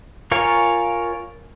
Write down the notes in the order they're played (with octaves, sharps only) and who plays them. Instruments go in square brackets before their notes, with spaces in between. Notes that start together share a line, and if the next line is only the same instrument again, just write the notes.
[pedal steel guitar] F4 A#4 C#5 F5 G#5